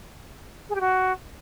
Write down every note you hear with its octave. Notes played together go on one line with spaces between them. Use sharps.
G#4
G4
F#4